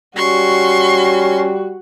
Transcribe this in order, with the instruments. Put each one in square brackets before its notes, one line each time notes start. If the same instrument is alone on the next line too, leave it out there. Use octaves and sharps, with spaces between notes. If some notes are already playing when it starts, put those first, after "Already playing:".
[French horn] G3 [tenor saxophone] C#4 [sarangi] F#4 [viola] C6 C#6